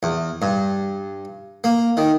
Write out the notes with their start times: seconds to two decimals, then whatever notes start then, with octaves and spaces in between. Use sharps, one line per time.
0.03 E2
0.42 G2
1.64 A#3
1.97 D#3